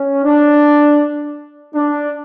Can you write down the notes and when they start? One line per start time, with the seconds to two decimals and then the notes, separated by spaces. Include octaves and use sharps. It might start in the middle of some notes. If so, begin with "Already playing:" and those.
Already playing: C#4
0.25 D4
1.75 D4